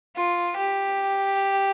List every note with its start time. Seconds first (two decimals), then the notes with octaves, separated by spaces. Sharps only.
0.16 F4
0.57 G4